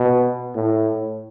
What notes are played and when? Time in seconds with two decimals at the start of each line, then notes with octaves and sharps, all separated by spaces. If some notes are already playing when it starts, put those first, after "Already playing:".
Already playing: B2
0.55 A2